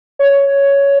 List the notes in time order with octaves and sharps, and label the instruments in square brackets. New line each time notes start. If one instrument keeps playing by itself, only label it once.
[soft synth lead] C#5